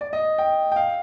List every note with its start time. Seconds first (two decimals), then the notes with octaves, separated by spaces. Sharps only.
0.01 D5
0.13 D#5
0.38 G5
0.72 G5
0.76 F5